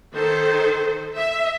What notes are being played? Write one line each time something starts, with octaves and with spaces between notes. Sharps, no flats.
D#3 A4 C5
E5